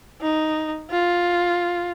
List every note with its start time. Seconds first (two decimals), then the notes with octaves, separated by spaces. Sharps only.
0.22 D#4
0.91 F4